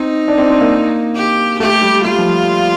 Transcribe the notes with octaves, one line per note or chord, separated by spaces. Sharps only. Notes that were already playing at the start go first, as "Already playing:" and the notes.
Already playing: C4 D#4
D4
C4
C4
A#3
G4
A3 G4
G3
G3 F4
F3